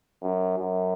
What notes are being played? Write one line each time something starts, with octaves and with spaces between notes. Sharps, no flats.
F#2
F#2